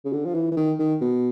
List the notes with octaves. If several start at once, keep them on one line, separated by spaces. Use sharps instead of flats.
C#3
D3
F3
E3
E3
D#3
D#3
B2